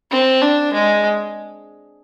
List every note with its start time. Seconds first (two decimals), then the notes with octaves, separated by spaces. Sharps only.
0.11 C4
0.42 D4
0.73 G#3